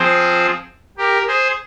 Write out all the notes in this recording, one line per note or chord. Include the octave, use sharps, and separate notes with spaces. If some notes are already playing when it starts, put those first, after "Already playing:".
Already playing: F3 C4 G#4 C5
G4 A#4
G#4 C5